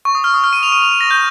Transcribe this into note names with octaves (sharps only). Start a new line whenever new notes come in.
C#6
D#6
F6
D#6
F6
D#7
F7
D#7
F7
D#7
A#6
G6